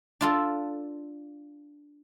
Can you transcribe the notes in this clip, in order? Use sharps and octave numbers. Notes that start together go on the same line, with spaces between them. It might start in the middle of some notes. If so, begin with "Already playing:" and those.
D4 F4 A4